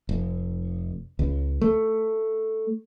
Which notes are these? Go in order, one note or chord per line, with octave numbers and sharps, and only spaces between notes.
F1
C#2
A3